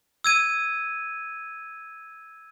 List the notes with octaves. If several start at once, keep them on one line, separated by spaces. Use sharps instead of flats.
E6 G#6 D#7